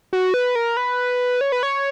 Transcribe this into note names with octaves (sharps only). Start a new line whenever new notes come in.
F#4
B4
A#4
B4
C#5
B4
C#5